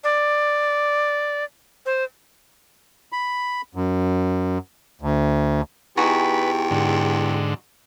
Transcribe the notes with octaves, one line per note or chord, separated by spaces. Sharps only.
D5
C5
B5
F#2
D2
E2 D#4 F#4 G4 B4 G#5
G#2 D3